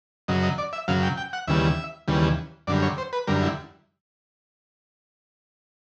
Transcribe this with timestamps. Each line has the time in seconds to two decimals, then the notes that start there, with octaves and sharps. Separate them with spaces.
0.28 F#2 C#3 F#3 D#5
0.43 D#5
0.58 D5
0.73 E5
0.88 F#2 C#3 F#3 F5
1.03 G5
1.17 G5
1.33 F#5
1.47 D#2 C#3 E3 G3 E5
2.08 D#2 C#3 E3 G3
2.67 F#2 D3 G3 D5
2.82 C#5
2.98 C5
3.13 B4
3.27 F#2 D3 G3 A#4
3.43 E4